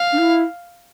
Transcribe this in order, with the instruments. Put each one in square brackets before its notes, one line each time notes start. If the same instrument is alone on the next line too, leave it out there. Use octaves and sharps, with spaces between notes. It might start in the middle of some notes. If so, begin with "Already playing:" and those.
Already playing: [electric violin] F5
[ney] D4
E4